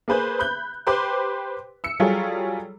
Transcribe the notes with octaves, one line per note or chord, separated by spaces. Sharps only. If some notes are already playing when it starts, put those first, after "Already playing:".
A#3 G#4 B4 C5
B5 F#6 G6
G4 B4 C5 C6 D6
E6 C#7
F#3 G3 F4 G#4 A4 C#5